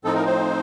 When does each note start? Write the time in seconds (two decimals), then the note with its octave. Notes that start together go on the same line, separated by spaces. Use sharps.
0.04 A2 F3 C4 D#4 A4
0.15 A#4
0.26 C5